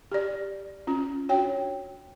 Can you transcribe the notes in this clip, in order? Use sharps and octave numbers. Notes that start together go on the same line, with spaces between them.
G4 D5
C#4 F4
D4 F#4 C#5 G5